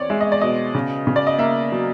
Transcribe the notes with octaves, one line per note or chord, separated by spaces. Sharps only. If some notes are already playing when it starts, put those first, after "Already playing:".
Already playing: E2 C4 C#5 D5
G#3 E5
D#5
D5
B2 D#5
C#3
C#3
D5
D#5
A#3 E5
F#3